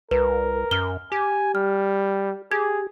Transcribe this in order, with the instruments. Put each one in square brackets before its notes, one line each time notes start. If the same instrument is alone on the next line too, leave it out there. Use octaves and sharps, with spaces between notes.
[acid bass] C2 [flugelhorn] A#4 [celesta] B4
[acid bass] F#2 [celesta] F6 G7
[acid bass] G4 [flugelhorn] G#5
[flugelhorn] G3 [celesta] F6
[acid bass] G4 [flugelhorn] G#4 [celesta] G#6